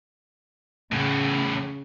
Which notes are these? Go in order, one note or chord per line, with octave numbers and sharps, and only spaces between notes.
E2 A2 C#3